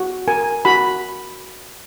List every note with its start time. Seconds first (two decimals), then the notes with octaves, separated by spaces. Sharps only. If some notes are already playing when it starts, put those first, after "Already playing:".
Already playing: F#4
0.28 A#4 G#5
0.65 F#4 B5